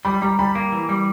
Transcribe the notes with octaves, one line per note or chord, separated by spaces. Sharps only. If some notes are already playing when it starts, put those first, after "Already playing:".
G3 B5
G3 A#5
G3 B5
A#3 A#5
E3
G3